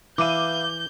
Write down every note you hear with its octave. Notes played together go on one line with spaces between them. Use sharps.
E3 B4 E5 F5 D6 G6 D#7